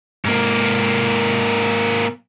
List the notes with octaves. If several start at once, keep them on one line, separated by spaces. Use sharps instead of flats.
G#2 A#3